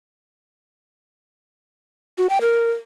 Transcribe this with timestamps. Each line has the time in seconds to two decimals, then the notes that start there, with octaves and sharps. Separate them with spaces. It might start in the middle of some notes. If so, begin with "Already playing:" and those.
2.18 F#4
2.30 G5
2.41 A#4